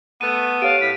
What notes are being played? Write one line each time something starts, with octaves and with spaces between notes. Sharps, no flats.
A3 B3 D#7
G4 C#5 F5 D7
A2 B6